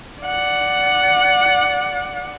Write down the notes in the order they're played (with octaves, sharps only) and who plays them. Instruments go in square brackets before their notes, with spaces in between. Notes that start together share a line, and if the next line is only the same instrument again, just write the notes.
[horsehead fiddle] D5 F#5